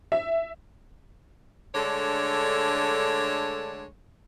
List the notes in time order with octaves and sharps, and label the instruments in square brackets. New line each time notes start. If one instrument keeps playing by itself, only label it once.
[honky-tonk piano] E5
[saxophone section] D3 G#3 A3 D4 A4 C#5